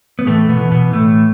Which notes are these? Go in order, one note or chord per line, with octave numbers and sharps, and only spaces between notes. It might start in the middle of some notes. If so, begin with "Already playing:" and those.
B3
A2 E3 A3
B2 B3
E3
B2 B3
A2 E3 A3